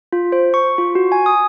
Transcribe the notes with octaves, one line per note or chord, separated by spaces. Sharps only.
F4
C5
C#6
F4
F#4
G#5
D#6